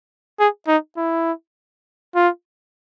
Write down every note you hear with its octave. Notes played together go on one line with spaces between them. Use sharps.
G#4
D#4
E4
F4